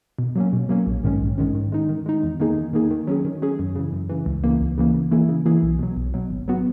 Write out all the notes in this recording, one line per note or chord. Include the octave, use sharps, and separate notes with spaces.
B2
F#3 A#3 C#4
B2
F#3 A#3 C#4
A#1
G#2 D#3 G#3 C#4
A#1
G#2 D#3 G#3 C#4
D#3
G#3 D#4
D#3
G#3 D#4
E2
D#3 A#3 D#4 G#4
E2
D#3 A#3 D#4 G#4
D#3
F#3 C#4 G#4
D#3
F#3 C#4 G#4
F#2
C#3 E3
F#2
C#3 E3
C#2
C#3 E3 A#3
C#2
C#3 E3 A#3
C#3
E3 A#3 E4 G#4
C#3
E3 A#3 E4 G#4
B1
B2 F#3
B1
B2 F#3
G#1
F#3 B3 F#4